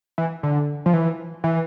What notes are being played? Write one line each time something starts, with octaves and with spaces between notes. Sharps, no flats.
E3
D3
F3
E3
E3